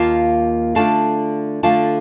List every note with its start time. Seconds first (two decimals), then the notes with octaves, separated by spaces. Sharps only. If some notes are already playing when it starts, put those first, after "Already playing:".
Already playing: D#2 A#3 F4 F5 A5
0.75 D3 A3 D4 F4 F5 A5
1.63 D3 A3 D4 F4 F5 A5